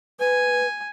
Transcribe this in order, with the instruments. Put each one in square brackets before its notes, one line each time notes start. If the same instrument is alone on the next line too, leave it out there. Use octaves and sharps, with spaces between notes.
[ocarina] B4 [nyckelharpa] G#5